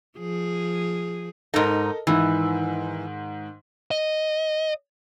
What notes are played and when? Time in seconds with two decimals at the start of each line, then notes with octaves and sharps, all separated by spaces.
0.18 F3 G#4
1.54 G#2 D#4 A4 A#4 D#5
2.07 G#2 D#3 E3
3.91 D#5